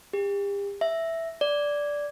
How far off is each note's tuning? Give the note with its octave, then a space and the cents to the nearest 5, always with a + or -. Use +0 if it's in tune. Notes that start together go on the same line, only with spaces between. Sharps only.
G4 +40
E5 +0
D5 -10